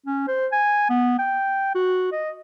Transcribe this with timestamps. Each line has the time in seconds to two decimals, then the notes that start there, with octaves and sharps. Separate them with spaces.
0.06 C#4
0.27 C5
0.52 G#5
0.89 B3
1.19 G5
1.75 F#4
2.12 D#5